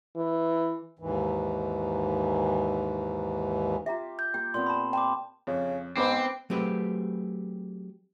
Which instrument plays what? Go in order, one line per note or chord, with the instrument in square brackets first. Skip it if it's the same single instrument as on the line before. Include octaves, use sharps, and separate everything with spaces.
[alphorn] E3
[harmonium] D#2 G#2 E3
[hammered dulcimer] F4 G4 [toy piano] E5 A#5
[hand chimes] G6
[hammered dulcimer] A#3 G4 [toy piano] G5
[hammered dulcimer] A#2 B3 C4 [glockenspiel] C6
[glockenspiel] A5 B5
[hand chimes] G5 [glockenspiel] A5 C6 D6
[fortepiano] F2 [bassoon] C#3
[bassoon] G#2 [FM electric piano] B3 D6 [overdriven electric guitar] C4 [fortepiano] B4 C5
[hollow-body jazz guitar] F#3 A3 C4 G4 G#4 B4